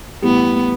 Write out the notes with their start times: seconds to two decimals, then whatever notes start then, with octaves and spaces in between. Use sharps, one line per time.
0.22 A2 E3 G3 B3